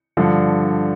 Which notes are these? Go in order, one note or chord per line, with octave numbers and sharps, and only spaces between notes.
G2 D3 F3